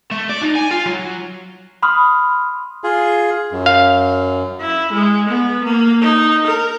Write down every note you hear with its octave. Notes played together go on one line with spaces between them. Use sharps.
A3
D5
D#4
G#5
F4
F#3
B5 C6 D#6 F6
F4 G#4
F#2
F5
E4
G#3
B3
A#3
D#4
A#4